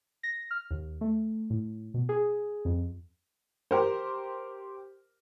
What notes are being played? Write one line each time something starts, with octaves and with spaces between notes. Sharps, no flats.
A#6
F6
D#2
A3
A2
B2
G#4
F2
G4 A#4 C5